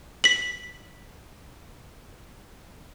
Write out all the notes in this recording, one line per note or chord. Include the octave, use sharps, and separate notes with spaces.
B6 F#7